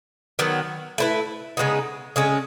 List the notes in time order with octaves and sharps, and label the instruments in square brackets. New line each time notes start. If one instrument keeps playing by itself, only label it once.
[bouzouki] D#3 F#3 B3
A3 E4 B4
C#3 G#3 B3 D#4
C#3 G#3 C#4